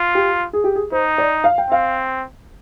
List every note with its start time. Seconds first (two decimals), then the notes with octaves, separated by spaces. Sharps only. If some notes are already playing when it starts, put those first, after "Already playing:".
Already playing: F4
0.15 G4
0.53 G#4
0.64 G4
0.75 G#4
0.92 D#4 C5
1.18 D5
1.44 F5
1.58 G5
1.70 C4 F5